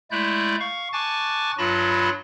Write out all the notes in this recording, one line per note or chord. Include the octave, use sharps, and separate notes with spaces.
G#3 A3 E4 D5 F#6 G6
F5 C#6
G#5 A5 C#6 D6 F#6 A6
G2 F#3 F4 A5 B5 A#6